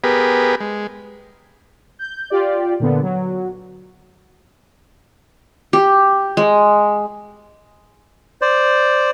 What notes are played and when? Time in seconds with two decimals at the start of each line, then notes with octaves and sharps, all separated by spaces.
0.04 B3 G4 G#4 A#4 B4
0.61 G#3
1.99 G6
2.30 F4 G4 D5
2.80 A#2 D3 B3
3.02 F#3
5.73 G4
6.37 G#3
8.42 C5 D5